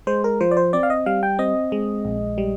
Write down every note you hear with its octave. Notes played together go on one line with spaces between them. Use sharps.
G#3 C5
A#4
F3 C5
D5
C5
C4 D5
F5
D#5
G3 F5
G5
C4 D#5
G#3
A#1
G3